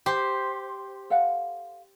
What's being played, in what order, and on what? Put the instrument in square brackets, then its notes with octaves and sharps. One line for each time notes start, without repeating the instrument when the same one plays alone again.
[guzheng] G4 C5
[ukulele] A4 F5 F#5